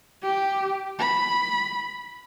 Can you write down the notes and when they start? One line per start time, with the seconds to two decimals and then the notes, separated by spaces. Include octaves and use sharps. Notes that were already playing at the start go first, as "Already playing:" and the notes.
0.23 G4
0.99 B5